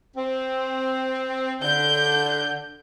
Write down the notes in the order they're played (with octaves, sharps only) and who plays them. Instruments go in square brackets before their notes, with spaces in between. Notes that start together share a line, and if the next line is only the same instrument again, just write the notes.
[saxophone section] C4
[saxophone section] D3 [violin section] G6